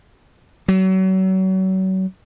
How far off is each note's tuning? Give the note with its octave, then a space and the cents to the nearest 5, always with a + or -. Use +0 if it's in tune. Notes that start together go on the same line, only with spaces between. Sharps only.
F#3 +35